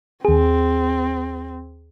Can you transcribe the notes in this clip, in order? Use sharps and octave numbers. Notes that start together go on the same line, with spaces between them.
D#2 C4 G#4